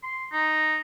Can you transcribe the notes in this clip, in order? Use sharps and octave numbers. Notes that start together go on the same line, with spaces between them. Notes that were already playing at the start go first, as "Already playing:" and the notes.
C6
D#4